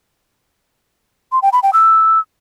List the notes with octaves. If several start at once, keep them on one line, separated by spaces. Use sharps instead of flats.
C6
G5
B5
G5
E6